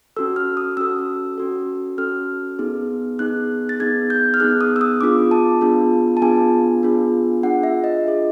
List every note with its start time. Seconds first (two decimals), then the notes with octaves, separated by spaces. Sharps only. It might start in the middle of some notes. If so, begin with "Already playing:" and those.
0.17 C#4 F#4 A4 E6
0.36 F6
0.57 D#6
0.77 C#4 F#4 A4 E6
1.38 C#4 F#4 A4
1.98 C#4 F#4 A4 F6
2.59 B3 D#4 G#4
3.19 B3 D#4 G#4 F#6
3.69 A6
3.80 B3 D#4 G#4 G#6
4.10 G6
4.34 F6
4.40 B3 D#4 G#4 F#6
4.61 D#6
4.76 E6
4.81 D#6
5.01 B3 D4 F4 G#4 D6
5.31 A5
5.61 B3 D4 F4 G#4
6.17 A5
6.22 B3 D4 F4 G#4 G#5
6.83 B3 D4 F4 G#4
7.43 D4 F4 G#4 F#5
7.63 E5
7.84 D#5
8.04 D4 F4 G#4